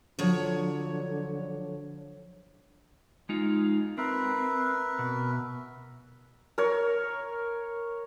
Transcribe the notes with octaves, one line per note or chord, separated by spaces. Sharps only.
D3 F3 F#3 C#5
G#3 D#4 F4
C4 A#4 B4 E5
B2
A#4 C#5